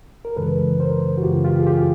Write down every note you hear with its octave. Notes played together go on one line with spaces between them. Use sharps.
A#4
F#2 C#3 E3 G#3 A4 B4
A#4 C5
F#4
F#2 C#3 E3 G#3 F4 G4
F4 G4
G#4
F4 G4